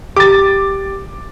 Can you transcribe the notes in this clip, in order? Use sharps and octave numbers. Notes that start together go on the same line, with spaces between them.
G4 D6 A6